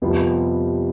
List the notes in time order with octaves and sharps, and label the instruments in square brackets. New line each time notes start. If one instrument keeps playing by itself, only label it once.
[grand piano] F2 C3 G3 B3 F4